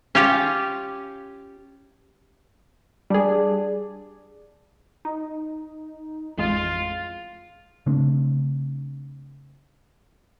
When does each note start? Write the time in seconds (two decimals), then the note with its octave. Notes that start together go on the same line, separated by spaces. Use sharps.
0.15 C#4 F4 G4
3.10 G3 D4 G#4
5.05 D#4
6.38 A1 F2 G#3 F4
7.86 C#3 A3 C4 D4